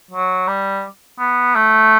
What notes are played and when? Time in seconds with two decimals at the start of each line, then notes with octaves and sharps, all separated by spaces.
0.11 F#3
0.47 G3
1.19 B3
1.55 A3